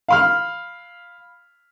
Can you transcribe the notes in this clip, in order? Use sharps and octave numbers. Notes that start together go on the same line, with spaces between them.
F5 B5 F6